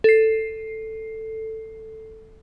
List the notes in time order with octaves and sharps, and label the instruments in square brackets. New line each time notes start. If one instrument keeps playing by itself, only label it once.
[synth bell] A4 C7